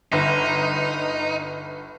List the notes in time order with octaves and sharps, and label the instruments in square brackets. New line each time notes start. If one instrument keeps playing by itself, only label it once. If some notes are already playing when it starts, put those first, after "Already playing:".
[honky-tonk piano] G1 [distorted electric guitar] D#4